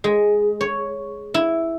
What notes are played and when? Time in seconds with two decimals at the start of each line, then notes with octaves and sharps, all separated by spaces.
0.04 G#3
0.61 C#5
1.34 E4